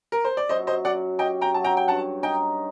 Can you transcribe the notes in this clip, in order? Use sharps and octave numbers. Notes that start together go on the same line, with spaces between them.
A#4
C5
D5
F#2 C5 D#5
C5 D#5
F#2 D5 F#5
G4 D#5 G5
G5 A#5
F#3 A5
G5 A#5
G5
G2 F#5 A5
D#4 D#5 G5